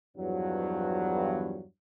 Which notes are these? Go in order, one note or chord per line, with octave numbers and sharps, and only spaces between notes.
E2 G2 F3 F#3